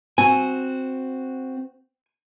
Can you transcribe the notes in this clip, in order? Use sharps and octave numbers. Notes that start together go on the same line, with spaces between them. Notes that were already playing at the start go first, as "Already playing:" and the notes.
C4 F#4 G#5